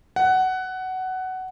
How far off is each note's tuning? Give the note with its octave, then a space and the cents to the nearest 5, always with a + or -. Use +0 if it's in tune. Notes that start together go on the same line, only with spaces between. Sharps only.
F#5 +15